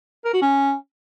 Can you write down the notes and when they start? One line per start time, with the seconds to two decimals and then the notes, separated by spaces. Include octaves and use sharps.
0.25 A#4
0.33 F#4
0.42 C#4